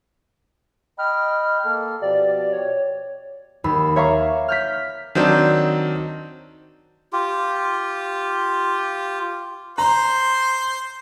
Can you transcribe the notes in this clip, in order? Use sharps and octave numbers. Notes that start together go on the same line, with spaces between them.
D#5 G5 B5 F6
A#3 A4
B2 F3 G4 D5
C#5
D#2 B5 E6
C#5 E5 F5 A#5 C#6 D6
F6 G6 B6
D#3 F#3 C4 D4
F4 G4
C5 A#5 C6